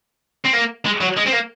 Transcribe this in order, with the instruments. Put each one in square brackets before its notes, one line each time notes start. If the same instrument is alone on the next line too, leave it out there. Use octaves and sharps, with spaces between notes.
[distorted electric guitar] C4
A#3
G#3
F#3
G#3
C4
A#3